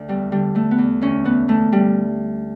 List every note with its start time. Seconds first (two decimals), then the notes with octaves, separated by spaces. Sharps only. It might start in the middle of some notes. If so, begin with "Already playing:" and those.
Already playing: D2 D4
0.09 E2 G3
0.32 D3 G3
0.55 E2 A3
0.71 B3
0.78 E2
1.01 D2 C#4
1.25 E3 B3
1.48 D2 A3
1.72 D2 G3